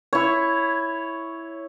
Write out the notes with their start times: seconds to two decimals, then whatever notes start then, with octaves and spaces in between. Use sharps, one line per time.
0.13 E4 C#5